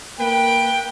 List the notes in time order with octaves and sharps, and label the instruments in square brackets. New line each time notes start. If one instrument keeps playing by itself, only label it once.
[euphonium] A#3 [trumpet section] B4 G5